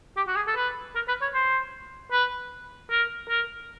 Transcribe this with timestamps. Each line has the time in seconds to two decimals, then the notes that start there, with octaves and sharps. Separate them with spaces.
0.17 G4
0.28 F#4
0.36 G#4
0.47 A4
0.56 B4
0.95 A#4
1.08 B4
1.22 C#5
1.34 C5
2.12 B4
2.90 A#4
3.29 A#4